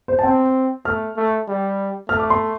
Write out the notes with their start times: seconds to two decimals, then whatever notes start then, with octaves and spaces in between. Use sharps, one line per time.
0.08 C5
0.19 A5
0.24 C4 G5
0.85 A3 F6
1.17 A3
1.48 G3
2.09 A3 F6
2.20 D6
2.30 C6